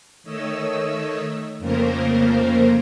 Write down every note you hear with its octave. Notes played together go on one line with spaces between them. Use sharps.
D#3 A3 C#5 D#5 E6
F2 C#3 A3 A#3 A#4 C5